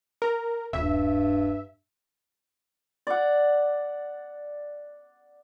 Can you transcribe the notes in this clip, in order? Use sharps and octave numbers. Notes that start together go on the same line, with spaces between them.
A#4
D#1 G2 E5
D5 F#5